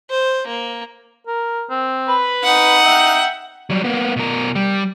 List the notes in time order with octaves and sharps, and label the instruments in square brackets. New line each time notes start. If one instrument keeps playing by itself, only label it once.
[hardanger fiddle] C5
A#3
[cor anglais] A#4
C4
[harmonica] B4 B5
[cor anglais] D#4 [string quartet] F#5
[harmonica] E5 G5
[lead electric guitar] F#3 G3
A#3 B3
B2 A#4
G3